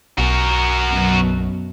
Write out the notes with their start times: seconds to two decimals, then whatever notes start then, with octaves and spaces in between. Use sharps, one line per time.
0.18 B1 F#4 A#4
0.88 F#2 B2